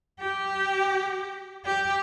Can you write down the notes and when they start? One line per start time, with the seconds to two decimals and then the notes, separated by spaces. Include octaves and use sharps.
0.20 G4
1.65 G4